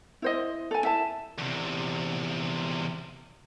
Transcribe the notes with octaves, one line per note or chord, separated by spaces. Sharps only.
E4 C5 D#5
A4 G#5
E4 E5 A5
E2 C3